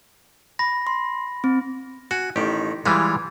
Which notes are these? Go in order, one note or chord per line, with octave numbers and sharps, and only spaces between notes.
B5 A#6
C6
C4
F#4 G#5
A1 D#3 G4
E3 G3 G#3 F4